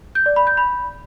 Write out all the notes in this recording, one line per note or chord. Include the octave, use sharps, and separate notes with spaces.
G6
D5
B5
G6
B5